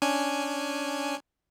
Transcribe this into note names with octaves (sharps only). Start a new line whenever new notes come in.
C#4 D4 G#5